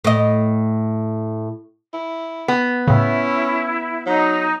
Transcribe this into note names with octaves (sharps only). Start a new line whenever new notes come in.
A2 D#5
E4
B3
A2 C#3 C#4 E4
F#3 D#4